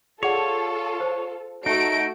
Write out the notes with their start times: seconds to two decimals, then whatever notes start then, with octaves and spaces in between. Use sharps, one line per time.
0.23 F4 G#4 A4 C#5 D5 F#5
1.00 C5
1.66 A3 D#4 F#4 D7